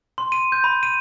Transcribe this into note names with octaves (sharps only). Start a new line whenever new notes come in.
C6
D#7
G6
B5
D#7